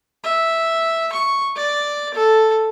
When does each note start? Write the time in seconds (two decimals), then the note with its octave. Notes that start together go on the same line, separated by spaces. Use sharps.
0.23 E5
1.12 C#6
1.55 D5
2.14 A4